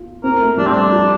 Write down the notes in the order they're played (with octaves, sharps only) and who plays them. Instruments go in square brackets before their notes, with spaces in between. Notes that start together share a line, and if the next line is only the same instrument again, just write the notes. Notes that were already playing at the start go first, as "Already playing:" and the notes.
Already playing: [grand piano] F4
[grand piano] C4 [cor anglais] A#4
[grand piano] A3
[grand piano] G3 [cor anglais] D4
[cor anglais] C4
D4
[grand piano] F3